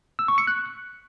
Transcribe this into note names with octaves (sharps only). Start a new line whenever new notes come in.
E6
C#6
C#7
F#6